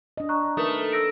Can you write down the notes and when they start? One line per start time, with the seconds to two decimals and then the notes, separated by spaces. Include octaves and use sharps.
0.17 D4 D#5
0.29 A#5 C#6 F#6
0.57 A3 D#4 A#4 B4 D#6
0.92 E6 A#6 D7